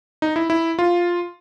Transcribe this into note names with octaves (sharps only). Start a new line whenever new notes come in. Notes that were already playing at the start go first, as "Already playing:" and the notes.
D#4
E4
E4
F4